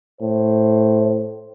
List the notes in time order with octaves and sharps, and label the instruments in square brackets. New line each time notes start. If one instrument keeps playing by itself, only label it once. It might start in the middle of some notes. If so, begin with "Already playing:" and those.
[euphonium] A2 [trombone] C5